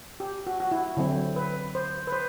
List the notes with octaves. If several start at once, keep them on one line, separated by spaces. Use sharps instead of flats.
G4
F#4
F#4
E4
D3 F#3 C4 E4
B4
C5
B4
C5